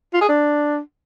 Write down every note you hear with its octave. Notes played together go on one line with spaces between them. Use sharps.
F4
G#4
D4